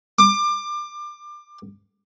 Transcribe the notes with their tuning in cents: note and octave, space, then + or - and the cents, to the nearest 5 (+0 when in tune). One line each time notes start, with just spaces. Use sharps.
D6 +25